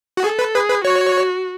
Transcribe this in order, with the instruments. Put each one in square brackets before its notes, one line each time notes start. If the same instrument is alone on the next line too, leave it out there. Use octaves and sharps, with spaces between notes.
[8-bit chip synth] F#4
[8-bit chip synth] G#4 [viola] A4
[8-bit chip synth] B4
[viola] G#4 [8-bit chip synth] B4
[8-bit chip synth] B4
[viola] F#4 [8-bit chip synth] C#5